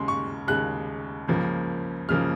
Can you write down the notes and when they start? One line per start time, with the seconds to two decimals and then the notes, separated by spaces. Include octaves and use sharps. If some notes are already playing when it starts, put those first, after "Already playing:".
Already playing: D#2 C#3 G#3 C6
0.08 C#6
0.48 D#2 C#3 G#3 F#6
1.28 C#2 C#3 F3 A#3
2.08 C#2 C#3 F3 A#3 F6